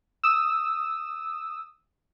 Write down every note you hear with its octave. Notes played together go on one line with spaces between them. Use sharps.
D#6 E6